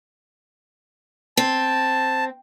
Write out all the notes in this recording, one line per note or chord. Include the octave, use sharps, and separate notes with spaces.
C4 A5